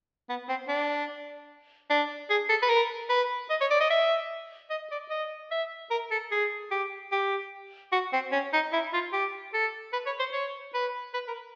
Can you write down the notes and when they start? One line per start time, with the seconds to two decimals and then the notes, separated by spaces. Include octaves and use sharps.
0.29 B3
0.49 C4
0.68 D4
1.90 D4
2.30 G#4
2.49 A4
2.62 B4
2.69 A#4
3.09 B4
3.50 D#5
3.61 C#5
3.71 D5
3.80 D#5
3.90 E5
4.70 D#5
4.91 D5
5.10 D#5
5.51 E5
5.91 A#4
6.11 A4
6.32 G#4
6.71 G4
7.12 G4
7.92 F#4
8.13 C4
8.32 C#4
8.53 D#4
8.73 E4
8.93 F4
9.12 G4
9.54 A4
9.93 B4
10.06 C#5
10.19 C5
10.33 C#5
10.74 B4
11.14 B4
11.28 A#4